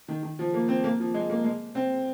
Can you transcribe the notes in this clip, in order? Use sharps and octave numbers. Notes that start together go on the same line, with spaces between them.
D#3
D#3
F3
A#3
C4
A#3
F3
G#3
A#3
G#3
C4